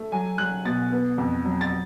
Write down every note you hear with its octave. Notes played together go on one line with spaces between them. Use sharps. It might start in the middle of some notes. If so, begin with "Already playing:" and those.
Already playing: A3
F#3 G#5
F#3 F#6
B2 A6
B3
F2
F#3
A6